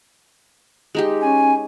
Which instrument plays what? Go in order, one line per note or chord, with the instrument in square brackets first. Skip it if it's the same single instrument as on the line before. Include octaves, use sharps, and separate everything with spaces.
[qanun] G#3 D#4 G4
[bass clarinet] C#4 [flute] G#5